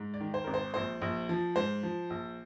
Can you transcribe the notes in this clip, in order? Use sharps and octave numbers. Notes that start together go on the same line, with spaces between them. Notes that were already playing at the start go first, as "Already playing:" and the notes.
Already playing: G#2
D5
D#3
C5
G#1 A#4
C5
A#1 C5
A#1
F3
G#2 C5
F3
A#1